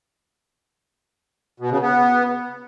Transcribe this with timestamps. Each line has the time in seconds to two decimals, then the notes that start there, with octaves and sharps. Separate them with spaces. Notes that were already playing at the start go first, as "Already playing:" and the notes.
1.60 B2
1.71 C#3
1.82 B3